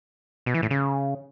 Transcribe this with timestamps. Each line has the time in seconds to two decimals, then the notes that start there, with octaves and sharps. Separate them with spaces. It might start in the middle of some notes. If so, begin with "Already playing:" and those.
0.46 B2
0.54 E3
0.62 A2
0.70 C#3